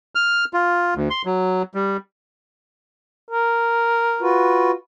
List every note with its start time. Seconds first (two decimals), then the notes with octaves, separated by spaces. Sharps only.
0.15 F6
0.53 F4
0.96 D2
1.10 C6
1.25 F#3
1.74 G3
3.31 A#4
4.21 F4 F#4 B4